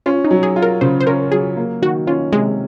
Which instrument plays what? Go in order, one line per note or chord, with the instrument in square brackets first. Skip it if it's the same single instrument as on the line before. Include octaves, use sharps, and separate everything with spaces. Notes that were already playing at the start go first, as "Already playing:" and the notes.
[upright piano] C#4 [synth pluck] F4
[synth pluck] D#4
[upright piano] F#3
[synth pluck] G#4
[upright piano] F4
[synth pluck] A#4
[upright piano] C#3 [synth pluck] C5
[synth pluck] C5
[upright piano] C#4 [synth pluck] A#4
[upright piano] F#3 [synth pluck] G#4
[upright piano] A#3
[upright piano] D#3 [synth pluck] F#4
[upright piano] C#4 [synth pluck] F4
[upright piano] C3 [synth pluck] G#3